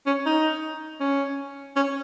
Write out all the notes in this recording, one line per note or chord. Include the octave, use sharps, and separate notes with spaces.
C#4
D#4
C#4
C#4